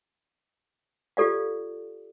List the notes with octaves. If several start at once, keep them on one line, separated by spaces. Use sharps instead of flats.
F4 G4 A4 D5 F5